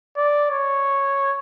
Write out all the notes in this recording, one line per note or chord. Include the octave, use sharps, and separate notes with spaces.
D5
C#5